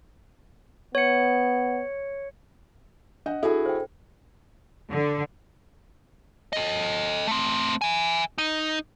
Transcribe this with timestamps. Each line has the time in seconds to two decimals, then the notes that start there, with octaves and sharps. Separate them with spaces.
0.95 B3 C#5 C#7
3.26 D4 D#5 F#5
3.43 E4 F#4 G#4 A4
3.66 C5 G5
4.91 D3
6.53 A4 D#5
7.27 A3 C4
7.81 E5 G#5
8.38 D#4